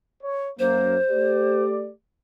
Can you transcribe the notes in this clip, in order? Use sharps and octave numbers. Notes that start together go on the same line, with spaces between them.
C#5
F#2 A#3 C5
A3 G4 D5